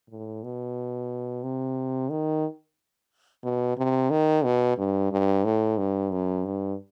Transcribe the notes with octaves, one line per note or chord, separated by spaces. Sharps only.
A2
B2
C3
D#3
B2
C3
D#3
B2
G2
G2
A2
G2
F#2
G2